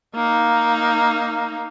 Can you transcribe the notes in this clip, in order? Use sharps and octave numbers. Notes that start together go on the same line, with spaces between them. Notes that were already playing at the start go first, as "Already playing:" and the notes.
A#3 D#4